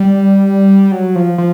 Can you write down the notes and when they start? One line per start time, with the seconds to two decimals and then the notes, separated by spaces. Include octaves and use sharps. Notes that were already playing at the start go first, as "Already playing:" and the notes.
Already playing: G3
0.92 F#3
1.15 F3
1.38 F3